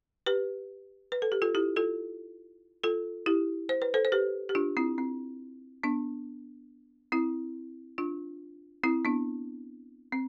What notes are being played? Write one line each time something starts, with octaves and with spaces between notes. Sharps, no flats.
G4 B4
B4
A4
G4
F4 A4
E4 G4
F4 A4
F4 A4
E4 G4
C5
B4
A4 C5
C5
G4 B4
G4
D4 F4
C4 E4
C4
B3 D4
C4 E4
D4 F4
C4 E4
B3 D4
C4